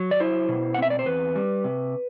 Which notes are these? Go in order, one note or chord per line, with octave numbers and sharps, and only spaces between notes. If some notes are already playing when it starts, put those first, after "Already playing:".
Already playing: F#3
D5
E4 C5
B2
F#5
C4 E5
D5
C5
E2 B4
G3
C3